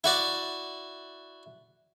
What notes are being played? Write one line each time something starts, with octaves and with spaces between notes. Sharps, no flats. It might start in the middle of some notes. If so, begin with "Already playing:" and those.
E4 F#4 D5